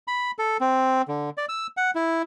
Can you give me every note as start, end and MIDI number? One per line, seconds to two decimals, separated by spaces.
0.08 0.31 83
0.39 0.57 69
0.61 1.02 60
1.08 1.30 50
1.37 1.46 74
1.49 1.67 88
1.77 1.91 78
1.95 2.22 64